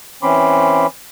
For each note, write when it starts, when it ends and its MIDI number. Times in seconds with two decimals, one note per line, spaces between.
0.23 0.86 52
0.23 0.86 60
0.23 0.86 61
0.23 0.86 83
0.23 0.86 84
0.23 0.86 86